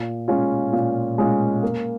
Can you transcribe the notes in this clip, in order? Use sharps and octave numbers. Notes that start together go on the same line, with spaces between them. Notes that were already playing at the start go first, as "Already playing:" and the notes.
Already playing: A#2
G#3 C#4 F4
A#2
G#3 C#4 F4
A#3